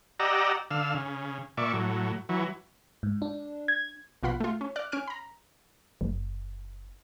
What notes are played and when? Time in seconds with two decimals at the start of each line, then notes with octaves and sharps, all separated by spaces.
0.20 G4 D5 D#5 F#5 A#5 E6
0.71 D3 F5 E6
0.95 C#3
1.57 A#2 D5 E5 C#6
1.73 A2 F#3
2.29 E3 F#3
3.03 G#2
3.22 D4
3.68 G#6
4.23 A#1 B2 F4 F#5 B5
4.40 A3 F4
4.61 C#4
4.76 D5 F6 F#6
4.92 C#4 G#5 F6 D7
5.07 A#5 B5
6.01 F#1